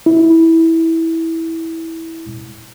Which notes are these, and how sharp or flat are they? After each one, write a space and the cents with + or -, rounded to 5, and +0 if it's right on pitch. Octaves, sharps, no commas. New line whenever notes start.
E4 -15